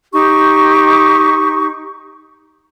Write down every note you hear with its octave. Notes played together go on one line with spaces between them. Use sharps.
D#4 G4 C#6